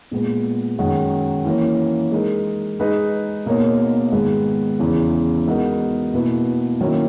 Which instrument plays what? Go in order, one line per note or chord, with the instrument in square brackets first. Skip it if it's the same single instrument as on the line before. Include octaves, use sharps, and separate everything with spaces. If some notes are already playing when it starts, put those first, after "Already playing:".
[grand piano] A#2 G#3 B3
F#2 D#3 G#3 D#4 F#4
E3 A#3 C#4
G#3 D#4 A#4
G#3 D#4 G#4 B4
B2 A#3 D#4 A#4 C#5
G#2 D#3 G#3 B3
E2 C#3 E3
G#3 B3 D#4 F#4 A#4
B2 A#3 E4 B4
D#3 F#3 A#3 C#4 E4